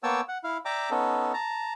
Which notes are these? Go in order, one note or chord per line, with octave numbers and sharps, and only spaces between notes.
A#3 B3 C#5 G5 A5 E6
F#5
E4 F5
D5 E5 G5 A#5 D6
B3 C#4 D#4 A4
A5 A#5